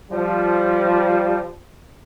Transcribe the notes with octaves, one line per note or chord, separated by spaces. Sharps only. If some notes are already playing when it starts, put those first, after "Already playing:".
F3 G3